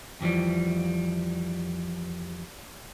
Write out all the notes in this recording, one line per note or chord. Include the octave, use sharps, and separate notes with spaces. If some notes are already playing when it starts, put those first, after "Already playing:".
F2 E3 F3 G3